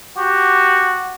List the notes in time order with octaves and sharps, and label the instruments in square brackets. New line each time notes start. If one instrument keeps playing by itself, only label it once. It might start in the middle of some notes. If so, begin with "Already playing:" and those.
[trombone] F#4 [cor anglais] G4